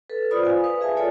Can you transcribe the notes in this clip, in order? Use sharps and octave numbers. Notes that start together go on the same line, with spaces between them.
A4 B4
F4 C5 D5 B5 D#6
F5 G#5
B4 D#6
G#4 E5 G#5 A5
F4 A4 C#5 D5 G#5